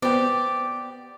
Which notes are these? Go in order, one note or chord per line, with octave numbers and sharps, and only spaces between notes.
B3 G4 C5 D5